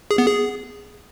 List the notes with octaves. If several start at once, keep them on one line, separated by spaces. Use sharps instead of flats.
G#4
B3
G#4